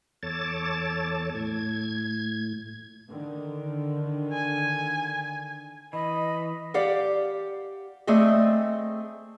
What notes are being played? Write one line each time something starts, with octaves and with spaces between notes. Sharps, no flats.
E2 A4 C#5 A5 D6 A6
A2 G#6
D3 D#3
G#5
E3 D#5 B5
G4 D5 F5 F#5
A3 C4 G#4 D5 D#5